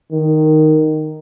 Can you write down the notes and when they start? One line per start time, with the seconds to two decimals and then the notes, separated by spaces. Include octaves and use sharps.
0.12 D#3